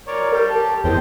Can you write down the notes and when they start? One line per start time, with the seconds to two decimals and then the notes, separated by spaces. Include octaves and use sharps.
0.07 A#4 C#5 D5
0.32 G3 A#4
0.49 G4 A5
0.84 E2 G#3 C5 G5